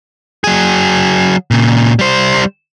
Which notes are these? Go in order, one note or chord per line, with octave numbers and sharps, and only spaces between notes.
F#3 G#4
A#2 C#3
G3 C5